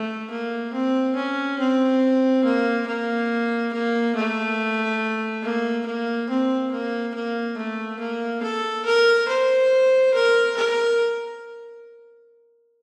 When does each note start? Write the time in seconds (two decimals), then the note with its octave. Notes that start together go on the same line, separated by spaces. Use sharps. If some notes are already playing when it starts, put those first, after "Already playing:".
Already playing: A3
0.30 A#3
0.73 C4
1.16 C#4
1.59 C4
2.44 A#3
2.87 A#3
3.73 A#3
4.15 A3
5.43 A#3
5.86 A#3
6.29 C4
6.72 A#3
7.14 A#3
7.57 A3
8.00 A#3
8.43 A4
8.85 A#4
9.28 C5
10.14 A#4
10.57 A#4